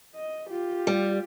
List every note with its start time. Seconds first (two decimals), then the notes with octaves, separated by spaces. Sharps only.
0.15 D#5
0.50 F4 G4
0.87 G3